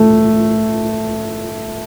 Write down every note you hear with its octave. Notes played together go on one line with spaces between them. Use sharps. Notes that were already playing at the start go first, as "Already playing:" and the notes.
Already playing: A3